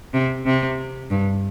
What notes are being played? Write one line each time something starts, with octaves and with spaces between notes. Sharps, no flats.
C3
C3
G2